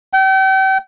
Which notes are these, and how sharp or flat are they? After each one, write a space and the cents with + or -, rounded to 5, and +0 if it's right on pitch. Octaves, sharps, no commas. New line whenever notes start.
G5 -40